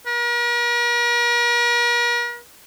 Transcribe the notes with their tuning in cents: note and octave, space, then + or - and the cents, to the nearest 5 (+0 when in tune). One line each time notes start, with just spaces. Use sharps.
A#4 +45